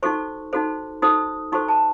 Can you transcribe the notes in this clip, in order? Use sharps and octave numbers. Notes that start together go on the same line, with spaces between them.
D#4 F#4 A4 C5 C#6
D#4 F#4 A4 C5
D#4 F#4 A4 C5 D#6
D#4 F#4 A4 C5 C#6
A5